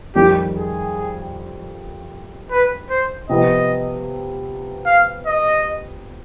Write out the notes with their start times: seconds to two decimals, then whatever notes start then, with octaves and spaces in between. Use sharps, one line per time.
0.15 F2 D#3 G3 G4
0.55 G#4
2.51 B4
2.90 C5
3.29 C3 F3 B3 D#5
4.86 F5
5.26 D#5